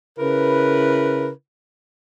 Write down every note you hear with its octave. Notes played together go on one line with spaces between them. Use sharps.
C#3 E4 A#4 B4